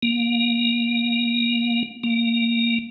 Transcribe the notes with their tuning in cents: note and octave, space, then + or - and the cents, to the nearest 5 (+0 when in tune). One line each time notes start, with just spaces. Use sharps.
A#3 +20
A#3 -5